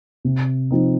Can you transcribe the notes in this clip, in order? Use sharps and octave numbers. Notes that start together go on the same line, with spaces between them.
C3
F3 C4 D#4